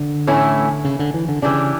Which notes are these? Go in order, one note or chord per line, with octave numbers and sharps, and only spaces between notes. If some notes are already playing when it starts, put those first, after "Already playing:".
Already playing: D3
A2 E3 A3 C#4 E4
C#3
D3
E3
D3
C#3 E3 G3 D4